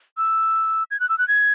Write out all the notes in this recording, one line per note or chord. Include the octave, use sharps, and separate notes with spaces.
E6
G#6
F#6
E6
F#6
G#6